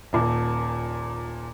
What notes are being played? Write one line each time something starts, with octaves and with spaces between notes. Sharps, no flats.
D#1 A#2